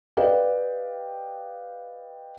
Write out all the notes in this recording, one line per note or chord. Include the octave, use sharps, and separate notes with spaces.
G4 B4 D5 D#5 F5 G5